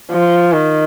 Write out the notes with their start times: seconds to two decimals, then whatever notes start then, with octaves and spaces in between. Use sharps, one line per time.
0.11 F3
0.53 D#3